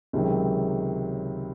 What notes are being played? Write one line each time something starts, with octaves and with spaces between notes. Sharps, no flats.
C#2 C3 D#3 F#3